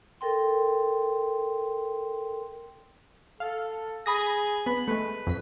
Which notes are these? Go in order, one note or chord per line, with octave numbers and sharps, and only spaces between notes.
A4 A#4 G5 C6
A4 F5
G#4 B5 D#6 A#6
B3 B5
G#3 A3 B4
F2 B6